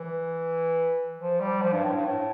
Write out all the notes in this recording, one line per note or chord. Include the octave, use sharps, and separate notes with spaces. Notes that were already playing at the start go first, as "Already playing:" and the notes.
Already playing: E3
F3
G3
F3
G2
A2
G2
A2